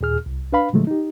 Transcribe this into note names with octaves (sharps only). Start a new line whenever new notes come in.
D#2 A#2 G#4 F6
C2
D4 B4 F5 B5
A#2 D3 F3 F#3 G#3 A3
D#4 G4